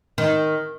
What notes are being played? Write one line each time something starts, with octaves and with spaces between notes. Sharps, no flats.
D#3